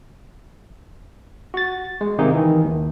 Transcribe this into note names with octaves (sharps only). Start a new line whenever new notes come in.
F#4 A6
G#3
C3 D#3 A#3 D#4 G#4
D#3 E3
D#2